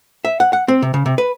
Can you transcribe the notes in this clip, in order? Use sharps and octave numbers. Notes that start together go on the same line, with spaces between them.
E5
F#5
F#5
C4
C3
C#3
C3
B4